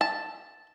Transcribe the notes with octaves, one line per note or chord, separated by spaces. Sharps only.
A5